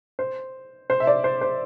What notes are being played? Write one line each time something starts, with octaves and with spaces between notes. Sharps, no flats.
C5
C5
E5
D5
C5
C5